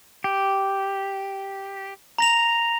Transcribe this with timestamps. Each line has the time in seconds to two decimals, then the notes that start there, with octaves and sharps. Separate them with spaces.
0.24 G4
2.18 A#5 A#6 F7